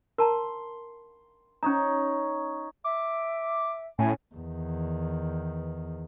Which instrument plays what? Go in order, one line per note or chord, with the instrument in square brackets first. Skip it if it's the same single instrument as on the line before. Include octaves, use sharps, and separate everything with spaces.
[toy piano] A#4 A5 A#5 [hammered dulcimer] C6
[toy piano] C#4 A#5 [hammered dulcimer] D#4 C#5
[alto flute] E5 [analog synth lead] D6
[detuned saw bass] A2 [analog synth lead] C#4 [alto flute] G#5
[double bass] E2 D#3